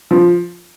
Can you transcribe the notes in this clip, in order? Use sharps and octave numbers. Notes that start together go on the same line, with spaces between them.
F3